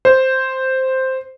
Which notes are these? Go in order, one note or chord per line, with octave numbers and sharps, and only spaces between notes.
C5